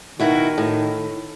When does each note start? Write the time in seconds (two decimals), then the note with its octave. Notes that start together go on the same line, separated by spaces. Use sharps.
0.19 B2 D#3 E4 F#4
0.58 A2